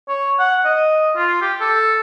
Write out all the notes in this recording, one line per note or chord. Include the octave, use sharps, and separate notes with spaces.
C#5
F#5
D#5
F4
G4
A4